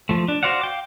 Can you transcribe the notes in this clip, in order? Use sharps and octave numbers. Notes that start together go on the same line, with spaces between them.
F3 A3
D4
F#4 C5 D5 F5 F#5
F5 G5 D6